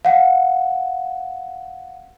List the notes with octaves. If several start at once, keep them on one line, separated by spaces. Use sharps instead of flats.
F5 F#5